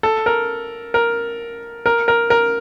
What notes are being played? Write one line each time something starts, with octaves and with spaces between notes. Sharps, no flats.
A4
A#4
A#4
A#4
A#4
A#4